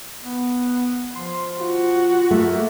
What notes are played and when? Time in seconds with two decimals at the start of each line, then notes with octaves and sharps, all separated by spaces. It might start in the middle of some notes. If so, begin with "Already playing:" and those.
0.22 B3
1.15 F3 C6
1.61 F4 F#4
2.31 A3 A#3